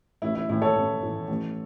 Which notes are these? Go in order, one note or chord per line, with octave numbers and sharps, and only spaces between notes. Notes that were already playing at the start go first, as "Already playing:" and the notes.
A1 E4
E4
A2 E3 E4
A4 C#5
A1
A2 E3
A1